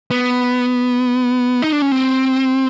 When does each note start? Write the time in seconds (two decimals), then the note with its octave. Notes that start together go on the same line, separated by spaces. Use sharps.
0.11 B3
1.62 D#4
1.72 D4
1.82 C#4
1.92 C4